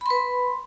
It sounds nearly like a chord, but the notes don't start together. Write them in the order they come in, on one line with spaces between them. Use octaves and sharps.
B5 C6 B4